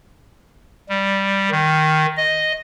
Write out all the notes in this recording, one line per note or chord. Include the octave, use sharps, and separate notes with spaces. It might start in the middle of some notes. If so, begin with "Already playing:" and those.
G3
D#3
D#5